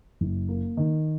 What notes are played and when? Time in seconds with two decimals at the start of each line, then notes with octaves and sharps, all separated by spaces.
0.21 F#1
0.49 A#3
0.77 D#3